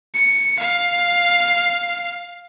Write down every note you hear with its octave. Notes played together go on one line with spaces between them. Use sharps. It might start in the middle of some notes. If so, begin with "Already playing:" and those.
C#7
F5